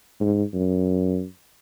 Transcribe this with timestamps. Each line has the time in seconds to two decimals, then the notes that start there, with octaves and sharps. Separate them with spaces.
0.20 G#2
0.54 F#2